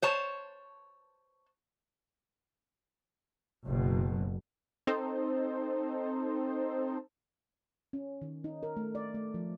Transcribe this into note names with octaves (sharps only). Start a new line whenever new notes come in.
C5 C#5 A5
F#1 B2
C4 D#4 A4 C5
C#4
D#3
D#4
A#4
A3
D5
A3
F3